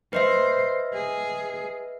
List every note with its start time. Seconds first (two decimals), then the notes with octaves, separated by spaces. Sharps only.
0.13 B4 C5 D#5 E5
0.94 G#4